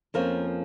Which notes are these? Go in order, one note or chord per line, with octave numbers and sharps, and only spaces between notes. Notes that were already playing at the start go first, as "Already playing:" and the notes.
F2 F3 A#3 C#4 A#4